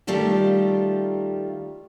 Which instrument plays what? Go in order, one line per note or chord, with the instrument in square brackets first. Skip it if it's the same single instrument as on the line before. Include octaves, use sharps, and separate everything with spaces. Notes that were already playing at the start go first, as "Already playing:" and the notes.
[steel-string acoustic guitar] D#3 G3 A3 F4 G4